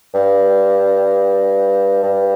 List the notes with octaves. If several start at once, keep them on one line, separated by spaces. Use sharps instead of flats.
G2
G2